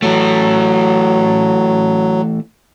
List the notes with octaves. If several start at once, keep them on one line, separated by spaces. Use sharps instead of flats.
E3 F#3 A3